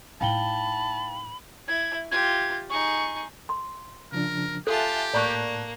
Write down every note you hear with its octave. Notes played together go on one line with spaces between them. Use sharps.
A2 D#4 F5 G5 A5 B5 G7
E4 G#6
F4 G4 G#6
D#4 G#4 C#6
C6
C#3 F3 D4 A#4
F4 G4 A4 E5 G#5 A5 F#6
A2 A#3 D5 A5 B5 C#6 F#6